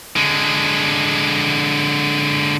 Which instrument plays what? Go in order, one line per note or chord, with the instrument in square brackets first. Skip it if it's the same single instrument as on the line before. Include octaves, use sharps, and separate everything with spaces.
[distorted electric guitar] D3 G#3